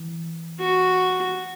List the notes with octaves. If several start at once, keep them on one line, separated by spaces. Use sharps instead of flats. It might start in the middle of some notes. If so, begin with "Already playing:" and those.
Already playing: E3
F#4